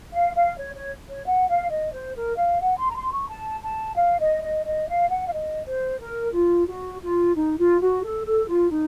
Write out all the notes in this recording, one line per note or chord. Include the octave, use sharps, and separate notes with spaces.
F5
F5
C#5
C#5
C#5
F#5
F5
D#5
C5
A#4
F5
F#5
C6
A#5
C6
C#6
A5
A5
F5
D#5
D#5
D#5
F5
F#5
F5
D#5
C5
A#4
F4
F#4
F4
D#4
F4
F#4
A4
A4
F4
D#4